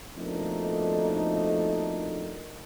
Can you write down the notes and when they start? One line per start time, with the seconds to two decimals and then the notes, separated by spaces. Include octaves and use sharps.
0.17 F2 B2 A3 A#3 D4 D#4